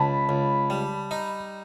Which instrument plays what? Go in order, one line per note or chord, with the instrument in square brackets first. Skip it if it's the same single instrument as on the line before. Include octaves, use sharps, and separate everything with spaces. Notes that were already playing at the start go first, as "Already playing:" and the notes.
Already playing: [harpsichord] C#2 [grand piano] A5 B5
[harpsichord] C#2
G3
D#4